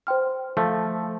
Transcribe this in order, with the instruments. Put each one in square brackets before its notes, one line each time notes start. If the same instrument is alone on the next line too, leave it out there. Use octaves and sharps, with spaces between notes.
[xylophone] C5 G5 C6 F6
[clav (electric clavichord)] F3 A3